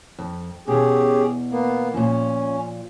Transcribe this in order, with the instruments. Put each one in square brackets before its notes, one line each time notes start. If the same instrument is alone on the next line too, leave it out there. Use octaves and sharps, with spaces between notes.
[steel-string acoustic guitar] F2
[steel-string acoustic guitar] E2 B2 [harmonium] C#4 G4 G#4
[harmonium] A#3 B3
[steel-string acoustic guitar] A#2 F3 [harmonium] C#4